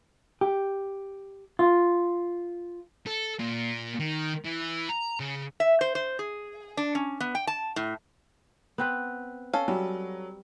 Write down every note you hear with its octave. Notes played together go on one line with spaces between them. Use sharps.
G4
F4
A4
A#2
D#3
E3
A#5
C#3
E5
C5
C5
G#4
D4
C#4
B3
G5
A5
A2
B3 C4 B4
C#4 A4 F5
F#3 G3